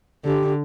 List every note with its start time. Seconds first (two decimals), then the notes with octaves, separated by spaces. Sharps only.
0.25 D3 G4